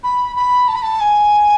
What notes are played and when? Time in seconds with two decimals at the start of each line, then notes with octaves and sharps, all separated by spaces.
0.03 B5
0.36 B5
0.68 A5
0.75 B5
0.82 A5
1.00 G#5